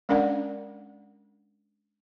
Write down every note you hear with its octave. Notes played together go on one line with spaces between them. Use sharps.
G#3 C#4 D4 A#4 D5 F#5